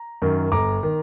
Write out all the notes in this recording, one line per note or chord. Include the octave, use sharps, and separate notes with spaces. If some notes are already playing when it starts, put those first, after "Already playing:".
Already playing: A#5
F#2 D#3
G1 A#5 D6
D#3